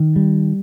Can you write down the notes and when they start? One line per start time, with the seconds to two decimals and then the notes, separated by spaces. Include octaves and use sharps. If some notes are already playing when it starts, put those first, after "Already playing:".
Already playing: D#3
0.16 G3